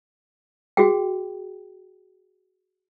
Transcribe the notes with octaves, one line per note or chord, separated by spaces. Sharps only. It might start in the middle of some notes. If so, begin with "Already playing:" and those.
F#4 G#4 G5